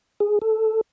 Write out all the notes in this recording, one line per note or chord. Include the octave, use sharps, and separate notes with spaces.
G#4
A4